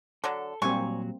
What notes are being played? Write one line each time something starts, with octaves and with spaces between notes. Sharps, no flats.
D3 F#3 D4 A4
A#2 F#3 G3 A#3 C4 D4 G#5 C#6